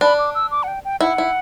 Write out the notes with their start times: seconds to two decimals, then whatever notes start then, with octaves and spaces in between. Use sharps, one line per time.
0.01 D4 B5
0.18 D6
0.35 E6
0.51 D6
0.63 F#5
0.68 G5
0.85 G5
1.01 E4 F#5
1.18 E4